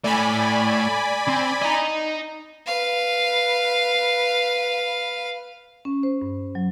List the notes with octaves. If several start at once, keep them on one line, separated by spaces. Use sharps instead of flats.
A2 D5 G#5 B5
C4
D#5 A#5
B4 F5
C#4
C5
G2
F#3